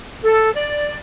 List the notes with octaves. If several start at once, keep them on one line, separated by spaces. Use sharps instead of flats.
A4
D5